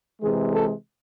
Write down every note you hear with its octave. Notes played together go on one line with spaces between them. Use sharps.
C3 E3 G#3 G#4
A4